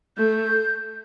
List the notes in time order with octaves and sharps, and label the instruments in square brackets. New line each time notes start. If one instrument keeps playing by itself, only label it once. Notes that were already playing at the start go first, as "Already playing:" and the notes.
[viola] A3 [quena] G6